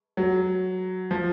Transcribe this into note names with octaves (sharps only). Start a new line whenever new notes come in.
F#3
F3